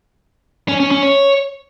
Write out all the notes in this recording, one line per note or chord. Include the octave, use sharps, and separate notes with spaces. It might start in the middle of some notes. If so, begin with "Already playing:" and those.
C#4
C#4
C#4
C#5